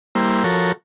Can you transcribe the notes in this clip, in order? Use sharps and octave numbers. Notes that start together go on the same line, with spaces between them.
G3 A#3 E4 C5
F3 F#4 A4 A#4 C#5